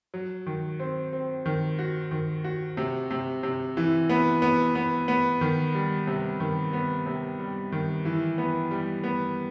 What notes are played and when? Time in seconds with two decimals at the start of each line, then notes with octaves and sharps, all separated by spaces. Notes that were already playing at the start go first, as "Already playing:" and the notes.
0.14 F#3
0.46 D#3
0.80 C4
1.13 C4
1.46 D#3
1.79 F#4
2.11 D#3
2.44 F#4
2.77 C3
3.11 C3
3.43 C3
3.77 E3
4.09 B3
4.42 B3
4.75 B3
5.08 B3
5.41 D#3
5.75 G3
6.07 C3
6.40 D#3
6.73 B3
7.06 C3
7.39 G3
7.72 D#3
8.05 E3
8.38 B3
8.71 G3
9.04 B3